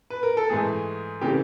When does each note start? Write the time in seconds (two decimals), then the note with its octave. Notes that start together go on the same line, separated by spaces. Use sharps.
0.10 B4
0.23 A#4
0.37 A4
0.49 G#2 E3 A3 G#4
1.21 C#3 E3 A3 G4